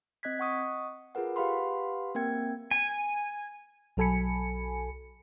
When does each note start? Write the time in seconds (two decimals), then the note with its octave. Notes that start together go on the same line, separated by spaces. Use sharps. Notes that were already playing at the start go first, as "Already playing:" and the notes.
0.23 C4 D#5 F#6 G#6 B6
0.38 D#5 F#5 C#6 D#6
1.15 F4 G#4 A#4 B4 F#5
1.36 G4 B4 F5 F#5 B5 C6
2.15 A#3 C4 A#4 G5 G#6
2.71 G#5
3.97 B1 F#3 A4 G#5 B5 C#7